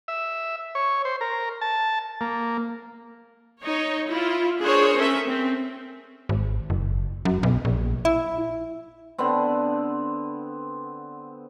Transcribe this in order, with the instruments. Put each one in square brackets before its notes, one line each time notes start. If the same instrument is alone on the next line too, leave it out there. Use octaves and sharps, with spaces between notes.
[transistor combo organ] E5
C#5
C5
A#4
A5
A#3
[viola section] D#4 C#5
E4 F4
D4 G#4 A#4 C5 C#5
C#4 A4 A#4 E5
C4
[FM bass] G#1
F#1
F#2
B1
A#1
E4
[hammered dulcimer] D3 B3 C4